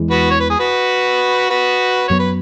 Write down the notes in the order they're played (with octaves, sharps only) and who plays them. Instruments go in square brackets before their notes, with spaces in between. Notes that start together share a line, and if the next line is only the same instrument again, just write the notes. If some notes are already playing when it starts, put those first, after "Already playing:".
Already playing: [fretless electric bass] E2 E3 G#3
[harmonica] F#4 B4
C#5
B4
G#4
F#4 B4
F#4 B4
[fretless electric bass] F#2 F#3 B3 [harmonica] C#5
[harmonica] B4